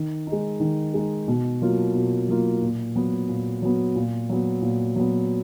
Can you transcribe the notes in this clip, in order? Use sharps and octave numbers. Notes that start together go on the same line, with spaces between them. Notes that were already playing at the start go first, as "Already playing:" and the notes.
Already playing: D#3
D#4
G#3
D#3
G#3 D#4
B2
F#3 A#3 F4
B2
F#3 A#3 F4
A#2
F#3 B3
A#2
F#3 B3
A#2
F#3 B3
A#2
F#3 B3